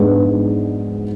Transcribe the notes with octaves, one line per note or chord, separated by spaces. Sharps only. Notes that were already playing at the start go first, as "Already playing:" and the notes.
Already playing: G#2 G#3 B3 D4